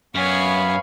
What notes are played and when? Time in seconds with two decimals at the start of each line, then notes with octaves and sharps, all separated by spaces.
0.15 F#2 B3 C#5 F5 G#5 B5